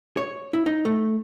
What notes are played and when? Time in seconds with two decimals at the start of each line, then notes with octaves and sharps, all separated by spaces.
0.17 C#5
0.53 E4
0.66 D#4
0.85 A3